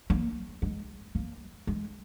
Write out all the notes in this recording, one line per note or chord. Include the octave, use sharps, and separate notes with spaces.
A#3
G#3
A#3
G#3